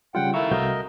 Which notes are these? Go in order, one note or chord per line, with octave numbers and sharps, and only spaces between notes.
C#3 G3 F4 F#5 G5
D#3 A3 E4 E5 F5 A#5 C#6
C2 F#4 A#4 D#5 G6